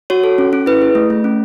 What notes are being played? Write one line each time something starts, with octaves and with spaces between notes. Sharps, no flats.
F#4 C#5
A4
C#4
C#4
E4 B4
G#4
A3
A3
C#4